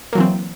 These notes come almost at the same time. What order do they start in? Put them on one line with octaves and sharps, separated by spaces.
A#3 F#3 E3 C4